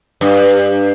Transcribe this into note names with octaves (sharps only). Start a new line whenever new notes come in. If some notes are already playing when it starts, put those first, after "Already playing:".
G2